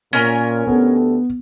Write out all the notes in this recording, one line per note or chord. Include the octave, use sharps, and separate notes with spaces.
A#2 C#4 A#4 G#5
D2 B3 G4 A4